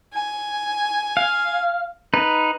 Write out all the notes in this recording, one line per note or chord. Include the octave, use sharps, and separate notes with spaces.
G#5
F5
D#4 B4